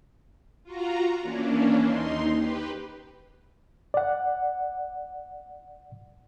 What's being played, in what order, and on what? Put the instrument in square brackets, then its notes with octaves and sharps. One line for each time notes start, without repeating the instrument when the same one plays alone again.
[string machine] F4 F#4 A#5
E3 A#3 C#4 D4
D#2 D#4 C6
G4 B4
[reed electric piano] D5 F#5